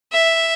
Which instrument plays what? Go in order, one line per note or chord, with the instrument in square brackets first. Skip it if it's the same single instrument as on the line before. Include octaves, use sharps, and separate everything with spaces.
[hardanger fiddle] E5